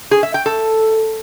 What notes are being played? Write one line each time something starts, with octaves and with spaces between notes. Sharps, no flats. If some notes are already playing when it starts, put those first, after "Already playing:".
G#4
E5
G5
A4